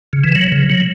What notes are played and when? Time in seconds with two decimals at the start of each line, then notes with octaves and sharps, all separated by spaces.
0.13 C#3
0.24 E3
0.36 F#3
0.52 C#3
0.70 F#3